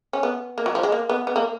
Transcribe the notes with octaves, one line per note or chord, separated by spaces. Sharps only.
C#4
B3
A#3
F#3
F3
G#3
A#3
B3
B3
A#3